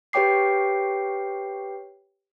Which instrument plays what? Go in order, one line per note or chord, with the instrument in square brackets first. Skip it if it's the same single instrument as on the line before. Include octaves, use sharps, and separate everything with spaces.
[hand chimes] G4 B4 C#5 G5 D6 C7